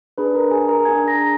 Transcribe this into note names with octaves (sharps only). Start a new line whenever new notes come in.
D4 G#4 B4 B5
A#4 A#5
G#4 G#5
A#4 A#5
D4 G#4 G#5 G#6
A#5 A#6